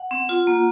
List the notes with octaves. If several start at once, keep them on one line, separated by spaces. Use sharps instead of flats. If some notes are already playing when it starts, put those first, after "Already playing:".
Already playing: F#5
C4
F4
A#3